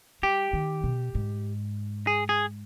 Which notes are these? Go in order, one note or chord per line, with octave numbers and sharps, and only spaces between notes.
G3 G4
D#3
B2
G#2
G#4
G#4